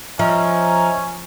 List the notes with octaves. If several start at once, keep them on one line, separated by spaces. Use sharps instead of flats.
F3 C#4 D#5 E5 A#5